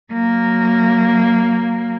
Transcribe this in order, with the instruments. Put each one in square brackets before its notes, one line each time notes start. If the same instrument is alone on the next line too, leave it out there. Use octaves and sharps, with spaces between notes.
[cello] F#3 A#3